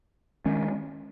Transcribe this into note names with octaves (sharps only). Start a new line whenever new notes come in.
D#3 G#3 C#4